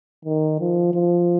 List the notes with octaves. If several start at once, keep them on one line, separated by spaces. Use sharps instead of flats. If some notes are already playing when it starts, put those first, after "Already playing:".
D#3
F3
F3